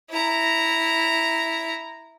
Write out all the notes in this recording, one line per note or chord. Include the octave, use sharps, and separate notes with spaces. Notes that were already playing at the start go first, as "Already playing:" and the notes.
E4 A#5